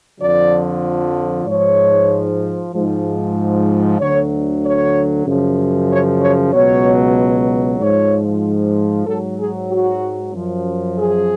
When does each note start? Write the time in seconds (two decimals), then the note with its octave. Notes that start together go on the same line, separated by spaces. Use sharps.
0.19 F2 D3 F3 D5
1.46 G#2 F3 C#5
2.74 G#2 F3
3.99 D2 D3 F#3 C#5
4.63 C#5
5.26 F#2 C#3 F3
5.91 C#5
6.21 C#5
6.53 C#2 B2 F#3 C#5
7.80 G#2 F3 C#5
9.07 G#2 F#3 A4
9.39 G#4
9.71 F#4
10.34 F#2 F3
10.97 G#4